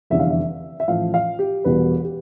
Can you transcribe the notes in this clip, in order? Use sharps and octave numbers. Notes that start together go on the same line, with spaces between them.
F1 E2 D3 G3 E5
F5
E5
E5
A1 A2 F3 F5
F5
G4
E1 E2 B2 G3 B4
G4